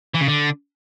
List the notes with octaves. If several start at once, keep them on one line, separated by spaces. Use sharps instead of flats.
E3
C#3
D3